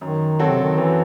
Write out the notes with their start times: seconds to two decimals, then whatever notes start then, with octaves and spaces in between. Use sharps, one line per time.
0.01 F#2 D#3
0.39 F#3 C4 F#4 A4
0.50 C3
0.64 D#3
0.78 F#2 E3